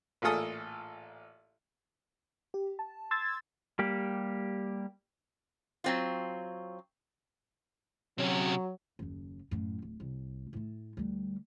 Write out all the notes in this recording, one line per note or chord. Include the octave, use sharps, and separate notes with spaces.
A1 A#2 F4 G#4 A4 D#6
G4
A5
C6 E6 G#6 A6
G3 A#3 G4
F#3 C4 F4
C3 F#3 C#4
F#1 D#2
F#2 A2
D1
C2
A2 A3
D2 G3